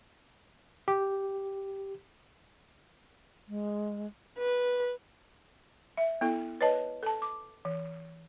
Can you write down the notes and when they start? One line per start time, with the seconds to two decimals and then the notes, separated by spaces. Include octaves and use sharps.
0.88 G4
3.48 G#3
4.38 B4
5.97 E5
6.21 B3 E4 A4
6.61 B4 C#5 D#5 A5
7.03 A4 A5
7.22 D6
7.65 E3